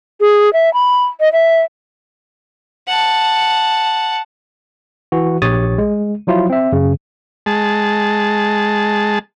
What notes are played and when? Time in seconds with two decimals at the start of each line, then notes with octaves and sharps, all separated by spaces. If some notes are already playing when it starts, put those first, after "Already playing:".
0.20 G#4
0.53 E5
0.74 B5
1.20 D#5
1.33 E5
2.88 F#5 A5
5.12 E3 F#4
5.42 A#1 G4 C#5 D#6 A6
5.78 G#3
6.27 F3 F#3 E4 F4
6.50 C4 E5
6.72 F#2 C#3
7.46 G#3 A5